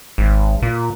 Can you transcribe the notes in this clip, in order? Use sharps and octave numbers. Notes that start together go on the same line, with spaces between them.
G#1
A#2